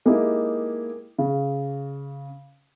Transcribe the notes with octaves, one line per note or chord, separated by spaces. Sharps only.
G#3 A#3 D#4 E4 G4 G#4
C#3